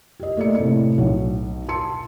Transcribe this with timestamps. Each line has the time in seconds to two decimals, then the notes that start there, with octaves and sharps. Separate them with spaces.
0.20 G4 D#5
0.37 A3 A#3 D5 D#5 C#7
0.55 A2 C3 C#7
0.98 B1 C#5 F#5
1.69 A5 C6 C#7